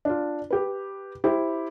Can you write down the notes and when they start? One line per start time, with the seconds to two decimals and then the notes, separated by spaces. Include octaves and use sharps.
0.05 D4 F4
0.50 G4 B4
1.24 E4 G4 C5